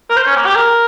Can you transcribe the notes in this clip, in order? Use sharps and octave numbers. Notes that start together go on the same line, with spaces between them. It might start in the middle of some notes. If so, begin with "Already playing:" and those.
A#4
C5
C#4
A#3
G4
A#4